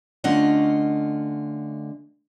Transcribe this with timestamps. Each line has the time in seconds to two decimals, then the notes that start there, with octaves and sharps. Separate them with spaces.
0.24 D3 A3 C#4 F4 D#5 F#5